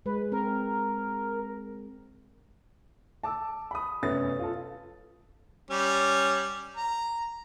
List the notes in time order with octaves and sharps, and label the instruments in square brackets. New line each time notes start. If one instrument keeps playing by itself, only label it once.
[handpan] G#3 [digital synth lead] B4
[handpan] C4 [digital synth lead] A#4
[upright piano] A5 D6 E6
B5 D#6
F1 F#2 B3 C#4 D#6 A6
F4 A4
[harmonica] G3 C#4
A#5